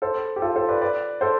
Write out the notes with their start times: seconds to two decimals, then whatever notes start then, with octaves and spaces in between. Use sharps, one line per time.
0.02 A4 C5
0.36 G4
0.42 F4 A4
0.56 A4 C5
0.69 B4 D5
0.81 B4 D5
1.21 A4 C5